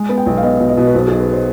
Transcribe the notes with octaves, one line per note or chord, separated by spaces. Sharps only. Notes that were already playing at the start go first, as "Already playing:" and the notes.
Already playing: G#3
B3
G5
B1
F5
B3 D#5
B2
D#5
B2
B4
B1 C5
G#4
B1
B4
C5